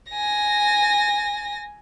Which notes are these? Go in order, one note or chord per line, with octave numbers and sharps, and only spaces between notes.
G#5 A#6